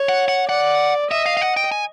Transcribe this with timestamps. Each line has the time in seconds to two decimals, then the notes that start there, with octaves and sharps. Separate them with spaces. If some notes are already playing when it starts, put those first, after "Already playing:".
Already playing: C#5
0.09 F#5
0.28 F#5
0.49 D5 F#5
1.11 D#5 E5
1.26 F5
1.37 F5
1.41 F#5
1.57 G5
1.72 G#5